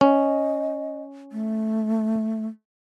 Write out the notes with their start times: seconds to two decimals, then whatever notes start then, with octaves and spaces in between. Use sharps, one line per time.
0.01 C#4 D#5
1.32 A3